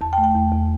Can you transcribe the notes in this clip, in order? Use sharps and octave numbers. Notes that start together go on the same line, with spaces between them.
E2 A5
G5
A3
G5
E2
E2